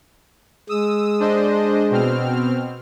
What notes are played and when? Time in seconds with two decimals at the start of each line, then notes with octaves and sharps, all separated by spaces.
0.69 G#3 D#6 E6
1.20 D4 C5 D#5
1.91 B2 C4 F6